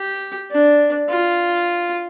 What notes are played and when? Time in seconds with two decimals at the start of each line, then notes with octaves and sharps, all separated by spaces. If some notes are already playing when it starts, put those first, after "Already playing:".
Already playing: G4
0.51 D4
1.10 F4